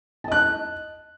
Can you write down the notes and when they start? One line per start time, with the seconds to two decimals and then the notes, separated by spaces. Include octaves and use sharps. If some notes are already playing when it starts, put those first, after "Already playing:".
0.24 A5
0.28 D#5
0.32 F#6